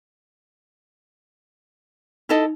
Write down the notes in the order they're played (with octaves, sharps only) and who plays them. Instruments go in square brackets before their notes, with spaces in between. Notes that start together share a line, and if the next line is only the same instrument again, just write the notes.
[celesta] D#4 [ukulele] E4 A4 D#5